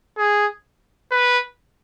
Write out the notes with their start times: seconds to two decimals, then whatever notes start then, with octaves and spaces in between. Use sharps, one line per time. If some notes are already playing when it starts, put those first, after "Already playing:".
0.18 G#4
1.11 B4